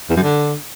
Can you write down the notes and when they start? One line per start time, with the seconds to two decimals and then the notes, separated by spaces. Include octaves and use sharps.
0.10 E2
0.16 F#2
0.23 D3